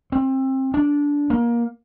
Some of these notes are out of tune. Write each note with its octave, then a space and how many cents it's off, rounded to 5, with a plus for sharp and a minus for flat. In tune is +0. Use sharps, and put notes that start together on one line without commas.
C4 +25
D4 -15
A#3 +20